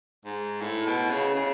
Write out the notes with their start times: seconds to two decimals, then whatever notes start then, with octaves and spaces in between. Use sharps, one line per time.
0.25 G#2
0.61 A2
0.87 B2
1.10 C#3
1.35 C#3